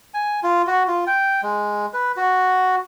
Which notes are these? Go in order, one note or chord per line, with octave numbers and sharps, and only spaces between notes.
G#5
F4
F#4
F4
G5
G#3
B4
F#4